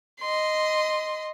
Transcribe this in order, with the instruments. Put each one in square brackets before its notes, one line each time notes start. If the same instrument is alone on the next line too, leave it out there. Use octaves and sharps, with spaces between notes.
[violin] D#5 C6